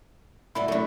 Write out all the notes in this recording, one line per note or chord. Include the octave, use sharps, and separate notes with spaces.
A2 F#3 G3 E4
F#2 F#3 A3 D4